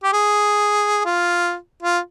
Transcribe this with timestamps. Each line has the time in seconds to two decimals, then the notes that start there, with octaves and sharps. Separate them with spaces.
0.03 G4
0.13 G#4
1.06 F4
1.83 F4